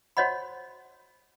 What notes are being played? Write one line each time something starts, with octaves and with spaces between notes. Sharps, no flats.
F#4 C5 C#5 D#5 F#5 B5